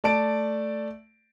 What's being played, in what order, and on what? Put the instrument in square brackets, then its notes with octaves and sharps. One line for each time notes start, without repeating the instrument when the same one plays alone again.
[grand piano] A3 D5 A5 D7